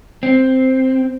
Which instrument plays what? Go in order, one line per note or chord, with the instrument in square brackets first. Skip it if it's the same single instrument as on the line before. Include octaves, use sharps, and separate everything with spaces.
[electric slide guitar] C4